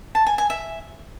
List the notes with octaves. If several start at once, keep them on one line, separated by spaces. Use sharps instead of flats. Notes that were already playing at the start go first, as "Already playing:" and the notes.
A5
G#5
G#5
E5